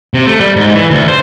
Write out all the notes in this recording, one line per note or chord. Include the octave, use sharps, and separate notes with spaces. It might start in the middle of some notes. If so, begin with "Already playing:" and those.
C3
A3
G3
G#2
E3
D2
C5